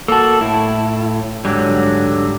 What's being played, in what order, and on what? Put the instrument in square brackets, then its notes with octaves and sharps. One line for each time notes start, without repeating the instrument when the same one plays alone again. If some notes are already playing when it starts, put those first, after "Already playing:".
[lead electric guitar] A#3 F#4 [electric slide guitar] A4 A5
[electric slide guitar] A2 [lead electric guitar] E4
[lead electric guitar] G#2 G3 [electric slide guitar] D3 F#3